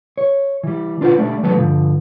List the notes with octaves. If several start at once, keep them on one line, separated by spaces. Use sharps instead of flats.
C#5
E3 G3
D4 F4 B4 C5 F#5
G3 A3 D4 D5
E3 F#3 G3 A3 B3
G2 D3 E3 F3